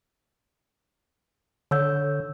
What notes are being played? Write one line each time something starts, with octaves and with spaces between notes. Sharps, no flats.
D3 C#5 E6 G6